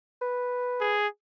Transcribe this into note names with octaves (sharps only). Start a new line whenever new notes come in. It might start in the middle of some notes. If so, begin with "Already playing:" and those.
B4
G#4